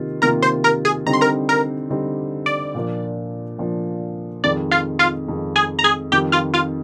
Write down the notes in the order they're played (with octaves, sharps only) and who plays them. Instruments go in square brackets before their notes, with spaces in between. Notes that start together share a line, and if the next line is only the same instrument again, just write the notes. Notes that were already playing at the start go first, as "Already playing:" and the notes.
Already playing: [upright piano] C3 D#3 A#3 F4
[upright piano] C3 D#3 A#3 F4 [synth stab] A#4 A#5
[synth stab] C5 C6
A#4 A#5
G#4 G#5
[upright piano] D3 G3 C4 D#4 [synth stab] A#5
[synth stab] C6
A#4 A#5
A#4 A#5
[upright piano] D3 G3 C4 D#4
[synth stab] D5
[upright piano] A#2 F3 A#3 D4
A#2 F3 A#3 D4
[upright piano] F2 D#3 G#3 [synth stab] D5
[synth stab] F4 F5
F4 F5
[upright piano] F2 D#3 G#3
[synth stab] G#4 G#5
A#5
G#4 G#5
[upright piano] F2 D#3 G3 [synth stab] G4 G5
[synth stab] F4 F5
F4 F5